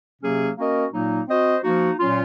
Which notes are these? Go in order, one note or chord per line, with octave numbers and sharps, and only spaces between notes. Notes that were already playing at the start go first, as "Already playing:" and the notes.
C3 F#3 A#3 C#4 G#4
A#3 C#4 F#4 A#4 D#5
A#2 F#3 A#3 D#4
C4 F#4 C5 D#5
F3 A#3 D#4 F#4
A#2 F#3 C#4 F4